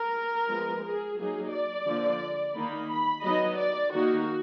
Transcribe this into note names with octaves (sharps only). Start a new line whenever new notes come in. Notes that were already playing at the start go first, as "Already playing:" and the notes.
Already playing: A#4
F3 G#3 B3
G#4
F#3 A#3 D#4 G#4
D5
D3 F3 A#3
D#3 A#3 D#4 B5
B5
F#3 B3 D#4 D#5
D5
D#3 A#3 D#4 F#4